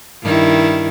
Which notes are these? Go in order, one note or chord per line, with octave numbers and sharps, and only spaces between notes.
G2 D#3 E4